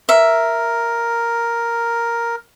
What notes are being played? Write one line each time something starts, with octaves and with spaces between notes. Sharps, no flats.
A#4 E5